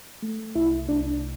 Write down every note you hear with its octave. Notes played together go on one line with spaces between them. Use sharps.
A3
C2 E4
C2 D4